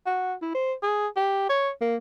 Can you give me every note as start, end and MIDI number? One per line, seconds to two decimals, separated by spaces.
0.06 0.34 66
0.42 0.52 64
0.55 0.73 72
0.83 1.07 68
1.16 1.48 67
1.50 1.71 73
1.81 1.96 58